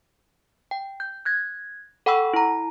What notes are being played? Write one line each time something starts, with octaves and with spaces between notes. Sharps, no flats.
G5
G6
F#6 G#6 A#6
A4 F#5 G5 B5 C#6 E6
E4 A#5